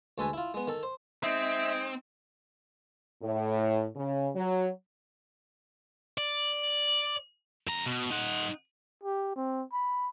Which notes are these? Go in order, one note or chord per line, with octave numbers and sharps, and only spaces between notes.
D2 G#3 A4 B4 G#5
E4 F4
G#3 B3
D#3 A4
C5
G#3 C4 D#4 E5
A2
C#3
F#3
D5
F2 A#5
B2
D#4 F#5
G4
C4
B5